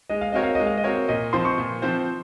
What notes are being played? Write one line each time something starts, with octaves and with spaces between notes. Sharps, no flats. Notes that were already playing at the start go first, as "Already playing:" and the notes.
G#3 D#5
F5
C4 F#4 A#4 C#5 D#5
F5
G#3 D#5
F5
D#5
C4 F#4 A#4 C#5
A#2 D#5
F3 C4 F4 C5 C6
C#6
A#2
F3 C4 F4 C5